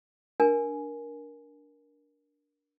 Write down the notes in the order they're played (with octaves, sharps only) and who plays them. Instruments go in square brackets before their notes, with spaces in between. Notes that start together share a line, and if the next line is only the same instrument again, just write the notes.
[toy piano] D4 A#4 G#5